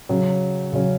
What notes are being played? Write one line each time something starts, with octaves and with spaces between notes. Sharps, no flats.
C#3 F#3 C#4
C#3 F#3 C#4